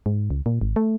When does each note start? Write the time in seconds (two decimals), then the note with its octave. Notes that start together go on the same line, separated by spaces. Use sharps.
0.06 G#2
0.30 C#2
0.46 A#2
0.61 G#1
0.76 A3